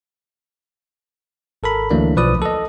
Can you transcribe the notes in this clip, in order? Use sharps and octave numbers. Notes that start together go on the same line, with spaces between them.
G#1 A4 A#4 B5
D2 E3 F#3 A3 A#3 D4
B1 F3 B4 D5 D#6
A4 D#5